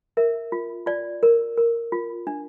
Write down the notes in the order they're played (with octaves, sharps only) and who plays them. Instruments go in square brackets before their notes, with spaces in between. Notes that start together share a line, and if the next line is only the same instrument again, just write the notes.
[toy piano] A#4 E5
F4
F4 D5
A#4
A#4
F4
D4